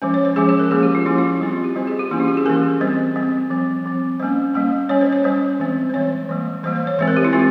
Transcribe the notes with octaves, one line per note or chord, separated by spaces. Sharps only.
F3 G#3 C#4 C5
C#5
C5
F3 G#3 C#4 G#4
G#4
A#4
F3 A#3 C#4 G#4
G4
F4
F3 A#3 C#4 E4
F4
F4
G3 C4 E4
F4
G4
G3 C4 C5
G#4
G4
E3 A#3 C#4 E4
F4
G4
G#4
E3 A#3 C#4 A#4
G3 C4 C5
G3 C4
F3 C4
F3 C4
G3 A#3 C#4 C5
G3 A#3 C#4
G3 C#4 C#5
C5
C#5
G3 C#4 C5
E3 G#3 C4
C5
E3 G#3 C4 C#5
E3 G3 A#3
E3 G3 A#3 C5
C5
C#5
E3 G#3 C4 C5
A#4
G4
E4
G#3 C4 F4